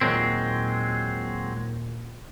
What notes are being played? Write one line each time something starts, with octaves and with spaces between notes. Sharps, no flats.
D#2 A#2 F#3 G#3 C4